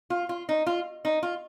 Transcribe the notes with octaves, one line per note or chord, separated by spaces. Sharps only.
F4
F4
D#4
F4
D#4
F4